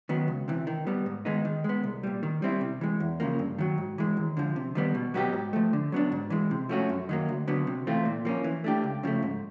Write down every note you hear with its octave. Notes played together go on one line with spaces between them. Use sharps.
D#3 F#3 B3
C#2
C3 E3
D#3
G3 B3
G#2
D#3 G#3 B3 D#4
D#3
G#3 B3
C2
A#2 G3
D#3
G3 C4 E4
C3
E3 G#3
E2
C#3 F3 A#3
G2
D#3 F#3
G#2
E3 G#3
D#2
D3 F3
C3
D#3 G3 B3
B2
F#3 B3 D#4 G4
G#2
F3 A3
D3
F#3 B3 D4
G#2
E3 G#3
C3
F3 A3 C#4 F#4
F#2
D#3 F#3 A#3
D2
D3 F#3 B3
C3
E3 A3 C4 F4
A#2
F3 A#3 C#4
E3
A3 D4 G4
C#2
C#3 F3 A3
G#2